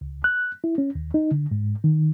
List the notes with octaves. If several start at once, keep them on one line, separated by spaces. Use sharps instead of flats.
C#2
F#6
E4
C#4
D#2
D#4
D3
G#2
D#3